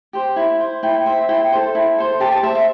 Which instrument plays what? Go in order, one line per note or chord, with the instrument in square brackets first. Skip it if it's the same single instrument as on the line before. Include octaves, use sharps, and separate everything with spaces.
[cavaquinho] G4 C5
E4
C5
E4 G5
C5 E5
E4 G5
A4 C5
E4
A4 C5
G4 A5
A5
C5 E5
E5